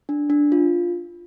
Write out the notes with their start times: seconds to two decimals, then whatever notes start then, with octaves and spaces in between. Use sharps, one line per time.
0.09 D4
0.30 D4
0.52 F4